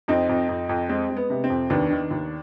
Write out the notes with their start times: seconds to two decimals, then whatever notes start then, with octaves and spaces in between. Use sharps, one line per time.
0.08 F2 C4 D#4
0.29 F2
0.49 F2
0.69 F2
0.89 G#3 C4
1.10 G#3
1.17 B3
1.30 C3
1.44 C4
1.50 F2
1.70 D#2 B3 D4
1.90 D#3
2.11 D#2